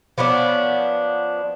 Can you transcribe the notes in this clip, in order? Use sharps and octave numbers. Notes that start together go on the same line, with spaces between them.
F3 B3 C#4 D4